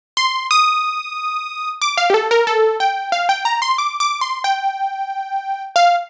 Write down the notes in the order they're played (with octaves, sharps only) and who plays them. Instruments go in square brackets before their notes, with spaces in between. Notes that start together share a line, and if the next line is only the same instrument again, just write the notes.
[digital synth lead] C6
D#6
D6
F5
G4
A4
A#4
A4
G5
F5
G5
A#5
C6
D6
D6
C6
G5
F5